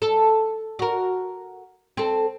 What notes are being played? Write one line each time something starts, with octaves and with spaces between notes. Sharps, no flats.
A4
F#4 A#4
C4 A4